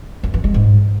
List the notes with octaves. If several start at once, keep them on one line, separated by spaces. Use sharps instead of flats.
F#2
E3
G#3
G#2